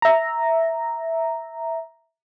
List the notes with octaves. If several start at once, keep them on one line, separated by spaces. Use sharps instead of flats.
E5 A#5